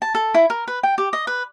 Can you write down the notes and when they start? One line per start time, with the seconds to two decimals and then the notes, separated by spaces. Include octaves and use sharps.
0.02 A5
0.15 A4
0.34 E4
0.50 A#4
0.68 B4
0.83 G5
0.98 G4
1.13 D#5
1.27 B4